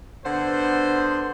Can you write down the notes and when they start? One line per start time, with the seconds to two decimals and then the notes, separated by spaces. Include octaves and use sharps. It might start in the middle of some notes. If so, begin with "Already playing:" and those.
0.25 D3 B3 C5